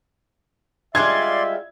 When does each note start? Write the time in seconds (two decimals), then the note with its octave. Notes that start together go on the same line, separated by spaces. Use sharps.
0.95 G3 G#3 F4 D5 E5 C6 G#6